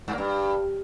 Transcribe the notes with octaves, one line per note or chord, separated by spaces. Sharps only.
G2
A#3
G2